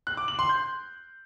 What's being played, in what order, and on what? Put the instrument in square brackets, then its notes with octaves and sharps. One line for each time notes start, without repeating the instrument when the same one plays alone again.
[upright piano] F#6
D6
F#7
C6
G6